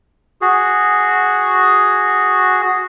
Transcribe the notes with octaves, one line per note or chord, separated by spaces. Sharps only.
F#4 G#4